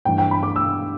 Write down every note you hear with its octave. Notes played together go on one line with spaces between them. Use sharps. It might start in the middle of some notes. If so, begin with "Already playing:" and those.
G2 E3 G5
G5
B5
D6
E6